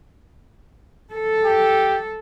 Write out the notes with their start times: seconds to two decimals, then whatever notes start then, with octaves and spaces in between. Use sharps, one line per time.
1.12 A4
1.44 G4